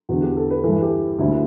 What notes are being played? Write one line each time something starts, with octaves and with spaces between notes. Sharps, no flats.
E2 D3 F#4
G4
A4
B4
G2 E3 A4
G4
D2 D3 E4